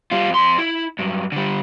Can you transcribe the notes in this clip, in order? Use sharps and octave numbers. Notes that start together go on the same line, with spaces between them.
G3 F4
F2 C6
E4
G2 F#3
D3 G3